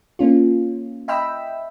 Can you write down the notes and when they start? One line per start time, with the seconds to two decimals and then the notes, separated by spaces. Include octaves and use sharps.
0.19 A#3 C#4 F4
1.08 D#5 E5 G5 B5 E6